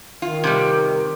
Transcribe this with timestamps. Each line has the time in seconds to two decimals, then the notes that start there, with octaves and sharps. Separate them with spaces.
0.22 D#3 F4
0.44 C3 G3